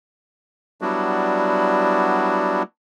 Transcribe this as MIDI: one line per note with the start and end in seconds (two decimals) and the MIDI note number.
0.81 2.63 54
0.81 2.63 55
0.81 2.63 59
0.81 2.63 62
0.81 2.63 64
0.81 2.63 66